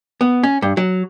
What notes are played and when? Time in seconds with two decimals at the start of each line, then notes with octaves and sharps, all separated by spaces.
0.21 B3
0.43 C#4
0.62 G2
0.77 F#3